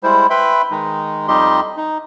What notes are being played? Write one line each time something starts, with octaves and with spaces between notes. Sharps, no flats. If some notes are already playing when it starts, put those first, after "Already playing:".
G3 G#3 E4 C5
B4 E5 G5 B5 C6
D#3 G#3 D#4
F2 G3 D#4 G4 D#5 C6
D#4